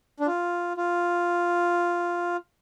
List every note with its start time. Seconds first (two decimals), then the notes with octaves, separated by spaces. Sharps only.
0.20 D4
0.27 F4
0.77 F4